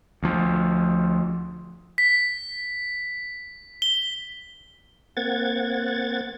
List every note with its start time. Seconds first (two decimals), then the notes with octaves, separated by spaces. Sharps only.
0.23 D2 F3
1.98 B6
3.82 G7
5.17 A#3 C4 F#5 G#6 A6